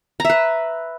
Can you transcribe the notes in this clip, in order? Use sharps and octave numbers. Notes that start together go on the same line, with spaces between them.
B4 E5 A#5